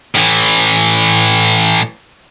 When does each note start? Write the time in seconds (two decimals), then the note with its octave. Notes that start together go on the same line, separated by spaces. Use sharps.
0.15 A2 E3